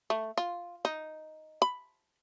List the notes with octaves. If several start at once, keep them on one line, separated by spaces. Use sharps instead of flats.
A3
F4
D#4
B5